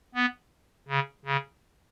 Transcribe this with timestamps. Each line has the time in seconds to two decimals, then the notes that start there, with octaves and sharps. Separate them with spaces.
0.14 B3
0.88 C#3
1.25 C#3